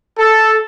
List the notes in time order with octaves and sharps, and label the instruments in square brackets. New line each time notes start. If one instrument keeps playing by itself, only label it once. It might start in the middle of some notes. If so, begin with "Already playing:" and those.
[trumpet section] A4